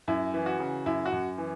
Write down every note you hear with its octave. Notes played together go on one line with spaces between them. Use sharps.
F#2 E4
E3
F#4
C#3
F#2 E4
F#4
F#2
E3